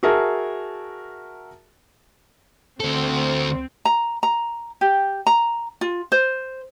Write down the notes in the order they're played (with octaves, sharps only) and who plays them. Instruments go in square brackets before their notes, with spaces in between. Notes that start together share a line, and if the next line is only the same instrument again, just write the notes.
[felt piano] F#4 G#4 A#4 E5 A5
[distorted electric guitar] D2 A4 [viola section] C4
[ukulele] A#5
A#5
G4
A#5
F4
C5